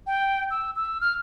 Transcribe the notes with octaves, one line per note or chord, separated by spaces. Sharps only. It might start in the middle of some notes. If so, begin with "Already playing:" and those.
G5
E6
E6
F6